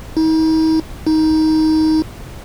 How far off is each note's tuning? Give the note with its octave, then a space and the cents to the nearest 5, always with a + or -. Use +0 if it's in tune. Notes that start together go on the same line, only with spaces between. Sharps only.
D#4 +40
D#4 +15